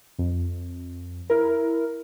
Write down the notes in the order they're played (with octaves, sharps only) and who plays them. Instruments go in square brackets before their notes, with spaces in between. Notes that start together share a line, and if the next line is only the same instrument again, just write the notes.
[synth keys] F2
E4 A#4